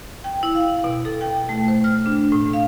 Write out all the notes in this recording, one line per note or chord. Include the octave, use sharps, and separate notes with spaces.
G5
E4
F5
B2
A4
G5
A3
C5
F6
D4
A2
F5